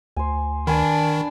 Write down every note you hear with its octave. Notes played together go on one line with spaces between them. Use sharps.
D2 C5 G#5
D#3 D4 B4 G#5 B5